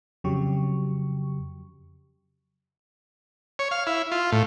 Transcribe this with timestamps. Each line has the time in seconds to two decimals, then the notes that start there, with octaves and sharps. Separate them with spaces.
0.24 F2 C#3 F#3 G4 C#6
3.59 C#5
3.71 F5
3.87 E4
4.12 F4
4.32 A2